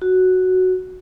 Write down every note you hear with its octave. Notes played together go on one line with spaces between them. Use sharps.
F#4